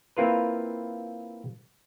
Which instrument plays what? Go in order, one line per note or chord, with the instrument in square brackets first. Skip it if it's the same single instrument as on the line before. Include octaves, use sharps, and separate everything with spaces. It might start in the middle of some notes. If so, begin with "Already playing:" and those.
[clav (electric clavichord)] A#3 C4 E4 F4 A#4 B4